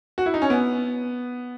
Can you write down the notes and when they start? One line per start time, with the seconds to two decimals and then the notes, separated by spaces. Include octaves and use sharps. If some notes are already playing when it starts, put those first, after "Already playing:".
0.18 F#4
0.26 E4
0.34 D#4
0.42 C#4
0.50 B3